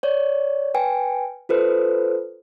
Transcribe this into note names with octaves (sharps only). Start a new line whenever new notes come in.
C#5 D5
B4 G5 G#5
F4 A4 B4 C5